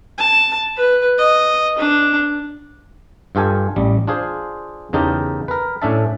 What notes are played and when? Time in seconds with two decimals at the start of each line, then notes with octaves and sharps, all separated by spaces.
0.18 A5
0.77 B4
1.18 D#5
1.78 D4
3.35 G2 F4 G4 A4 G#5
3.76 A1 G3
4.07 D4 F4 G#4 C5
4.93 E2 C#3 D#4 G4 A#4 A5
5.48 A#4 B4
5.82 A2 C#4 D4 E5 A5